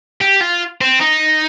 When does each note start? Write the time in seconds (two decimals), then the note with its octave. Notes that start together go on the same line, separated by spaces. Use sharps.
0.21 G4
0.41 F4
0.81 C4
1.01 D#4